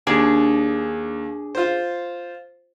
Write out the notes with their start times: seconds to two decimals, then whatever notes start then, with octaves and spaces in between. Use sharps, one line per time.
0.07 D#2 D4 G#4 D5
1.55 F4 C5